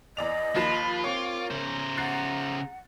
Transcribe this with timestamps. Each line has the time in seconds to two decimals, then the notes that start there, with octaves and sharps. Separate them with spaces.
0.17 E2 D5 D#5 F7
0.56 D#2 F3 F4 B5 E7
1.04 C4 A#4 C#5 D6
1.51 C#3 C5 A#5
1.97 F#5 F#6 A6 C7